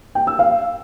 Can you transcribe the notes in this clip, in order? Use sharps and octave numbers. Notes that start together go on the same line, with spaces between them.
G5
E6
F5